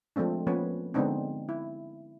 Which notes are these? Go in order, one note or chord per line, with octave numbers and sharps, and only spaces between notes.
F3 G#3 A3 C4 D4
F3 A#3 B3 C#4 B4 C#5
D3 G#3 B3 C4 D4 D#4
E4